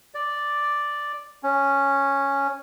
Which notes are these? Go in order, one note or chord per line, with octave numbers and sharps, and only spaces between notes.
D5
C#4